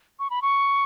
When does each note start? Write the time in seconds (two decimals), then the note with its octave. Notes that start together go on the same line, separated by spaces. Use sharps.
0.19 C#6
0.30 B5
0.42 C#6